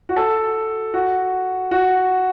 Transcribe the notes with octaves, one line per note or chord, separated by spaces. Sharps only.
F#4
A4
F#4
F#4